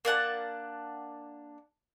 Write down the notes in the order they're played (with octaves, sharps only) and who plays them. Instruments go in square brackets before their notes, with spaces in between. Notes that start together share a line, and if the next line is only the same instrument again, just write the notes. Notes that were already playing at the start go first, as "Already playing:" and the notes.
[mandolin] A#3 D4 F#5 A5